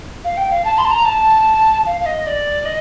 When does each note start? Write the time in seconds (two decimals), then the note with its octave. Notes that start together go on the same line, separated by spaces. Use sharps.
0.24 F5
0.37 G5
0.51 F5
0.65 A5
0.78 C6
0.85 A5
0.91 A#5
1.05 A5
1.86 F5
2.01 F5
2.06 D#5
2.26 D5
2.65 D#5